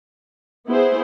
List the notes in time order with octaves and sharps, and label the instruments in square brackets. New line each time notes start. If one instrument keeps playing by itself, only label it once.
[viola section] B3 E4 G#4 C5